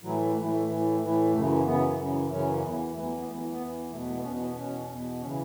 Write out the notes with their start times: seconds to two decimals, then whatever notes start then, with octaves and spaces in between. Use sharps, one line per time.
0.02 A2 E3 F#3
0.35 A2 A3
0.39 E3
0.44 F#3
0.52 A3
0.67 A2 E3
1.00 A2 E3
1.32 F#2 C#3 E3 A3
1.65 F#2 C#3 E3 B3
1.97 F#2 C#3 E3
2.29 F#2 C#3 E3 C#4
2.62 E2 E3
2.94 E2 E3 A3
3.03 F#3
3.19 B3
3.27 E2 A3
3.31 E3 F#3
3.43 A3
3.51 B3
3.59 E2 E3
3.92 E2 B2 A3
4.00 F#3
4.08 A3
4.16 B3
4.24 E2 C#4
4.29 B2
4.41 B3
4.56 E2 B2 C#4
4.89 E2 B2
5.22 C#3 E3 C#4